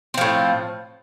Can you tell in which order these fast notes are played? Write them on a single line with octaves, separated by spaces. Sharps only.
C4 F3 A2